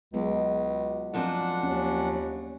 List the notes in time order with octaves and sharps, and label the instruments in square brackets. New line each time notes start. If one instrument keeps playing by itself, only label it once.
[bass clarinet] C#2 [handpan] F#3 G#3 B3
[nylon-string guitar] F#2 F3 C4 [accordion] D4 F#5
[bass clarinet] D#2 [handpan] C#4